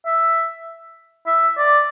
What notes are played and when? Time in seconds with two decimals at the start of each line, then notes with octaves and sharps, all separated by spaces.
0.06 E5
1.27 E5
1.58 D5